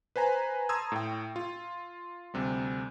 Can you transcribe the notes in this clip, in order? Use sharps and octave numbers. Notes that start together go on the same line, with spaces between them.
B4 C5 G#5 A#5
A5 A#5 C6 D#6 E6 G#6
A2 G5
F4
D2 C3 G3